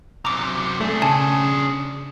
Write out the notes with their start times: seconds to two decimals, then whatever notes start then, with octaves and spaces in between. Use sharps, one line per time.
0.25 F#2 C3 A#5 D6
0.81 A3 D4 G#4
1.02 C#3 G#5 A5